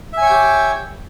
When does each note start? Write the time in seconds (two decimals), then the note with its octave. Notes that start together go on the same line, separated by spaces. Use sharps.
0.13 E5
0.17 G#5
0.22 C#5
0.26 G5
0.30 G4